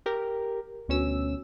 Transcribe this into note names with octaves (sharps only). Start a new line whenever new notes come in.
G4 A#4
D2 B2 C#4 E6